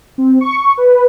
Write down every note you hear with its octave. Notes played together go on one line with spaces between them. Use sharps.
C4
C#6
B4